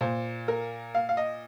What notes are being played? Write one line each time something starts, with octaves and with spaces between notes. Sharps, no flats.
A#2 C5
A#4
F5
F5
D#5